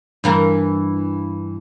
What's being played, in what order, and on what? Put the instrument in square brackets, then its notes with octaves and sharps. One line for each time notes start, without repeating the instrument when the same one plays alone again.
[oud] G2 E3 A#4